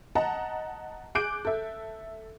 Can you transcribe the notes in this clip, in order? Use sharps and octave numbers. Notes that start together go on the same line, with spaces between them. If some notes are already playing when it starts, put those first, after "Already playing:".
D#5 F#5 A5 A#5
G#4 D6 F#6 G6 D7
A4 E5